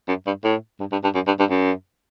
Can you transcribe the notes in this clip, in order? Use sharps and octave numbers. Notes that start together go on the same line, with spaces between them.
F#2
G2
A2
G2
G2
G2
F#2
G2
G2
F#2